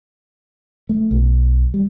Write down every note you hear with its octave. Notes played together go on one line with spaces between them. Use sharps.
A3
B1
G3